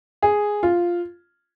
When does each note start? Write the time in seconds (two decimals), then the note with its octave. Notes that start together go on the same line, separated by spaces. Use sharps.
0.23 G#4
0.63 F4